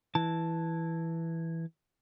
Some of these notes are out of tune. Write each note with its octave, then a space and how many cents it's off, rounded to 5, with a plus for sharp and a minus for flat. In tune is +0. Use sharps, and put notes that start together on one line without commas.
E3 +0 A5 +0